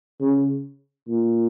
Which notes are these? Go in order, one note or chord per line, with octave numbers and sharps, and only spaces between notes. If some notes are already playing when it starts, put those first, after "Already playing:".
C#3
A#2